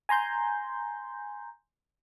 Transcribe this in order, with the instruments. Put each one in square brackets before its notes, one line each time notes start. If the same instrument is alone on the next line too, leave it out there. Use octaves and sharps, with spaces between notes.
[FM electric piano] G#5 A#5 C6 G6